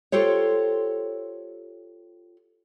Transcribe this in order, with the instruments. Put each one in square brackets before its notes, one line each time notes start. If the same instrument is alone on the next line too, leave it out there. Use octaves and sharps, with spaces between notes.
[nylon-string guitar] F4 G4 A4 C5 C#5